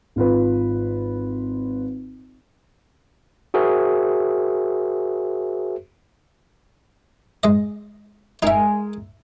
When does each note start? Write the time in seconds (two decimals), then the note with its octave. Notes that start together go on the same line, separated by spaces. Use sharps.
0.16 G#1 F4 B4
3.54 F#4 G#4 A#4 C5 E5
7.43 G#3 D#5
8.43 G#3 D#4 G#4 A#4 E5